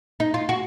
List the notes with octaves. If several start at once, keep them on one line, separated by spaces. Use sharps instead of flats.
D#4
F4
F#4